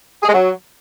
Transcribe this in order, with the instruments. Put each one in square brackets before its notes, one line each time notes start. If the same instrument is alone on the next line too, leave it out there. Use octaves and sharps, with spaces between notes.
[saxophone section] G#4
G#3
F#3